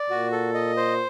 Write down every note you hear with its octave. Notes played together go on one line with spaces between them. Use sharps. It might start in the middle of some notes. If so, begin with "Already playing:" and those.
Already playing: D5
A#2 F#4
A4
D#5
C5